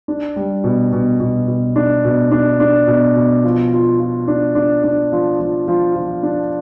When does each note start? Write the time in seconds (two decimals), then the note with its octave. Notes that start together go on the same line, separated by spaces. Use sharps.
0.08 D4
0.36 G3
0.64 B2
0.93 B2
1.20 B2
1.48 B2
1.76 D4
2.05 B2
2.31 D4
2.60 D4
2.87 B2
3.16 B2
3.44 F3
3.72 F4
3.99 F4
4.28 D4
4.55 D4
4.84 D4
5.12 F3
5.40 F3
5.68 F3
5.96 F3
6.23 D4